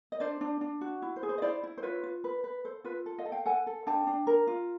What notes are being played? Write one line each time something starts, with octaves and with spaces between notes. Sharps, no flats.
D#5
D4 C5 D5
D4
D4
F#4
E4
C5
G#4
C5
D#5
E4 C5 D5
E4
C5
F4 B4 C#5
F4
B4
B4
A4 C5
F4 B4
A4
D#5 F5
A4
F5 G5
A4 F#5 G#5
A4
D4 G5 A5
D4
A#4
F4